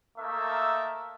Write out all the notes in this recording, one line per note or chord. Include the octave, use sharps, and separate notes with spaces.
A3 A#3 D#4 E5 A5